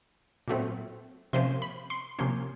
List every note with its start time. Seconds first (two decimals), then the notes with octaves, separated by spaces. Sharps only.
0.48 A#2 F#3 A3 C4
1.33 C3 F3 A#3 C#4 C6
1.62 B5
1.90 C6
2.19 C3 F3 A#3 C#4 C6